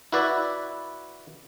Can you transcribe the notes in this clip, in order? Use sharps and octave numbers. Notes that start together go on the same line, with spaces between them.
E4 F#4 B4 D5 E5